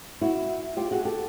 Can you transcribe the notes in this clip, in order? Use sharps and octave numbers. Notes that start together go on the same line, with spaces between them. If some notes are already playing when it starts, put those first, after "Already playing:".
E4 F#4
F4 G4
F#4 G#4
G4 A4